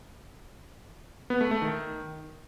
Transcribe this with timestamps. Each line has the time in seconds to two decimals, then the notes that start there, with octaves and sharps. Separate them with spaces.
1.30 B3
1.41 A3
1.51 A3
1.62 D#3